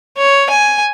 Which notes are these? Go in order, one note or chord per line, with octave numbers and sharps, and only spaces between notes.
C#5
G#5